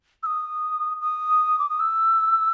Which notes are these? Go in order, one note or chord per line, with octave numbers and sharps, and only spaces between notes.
E6
D#6
D#6
D6
D#6
E6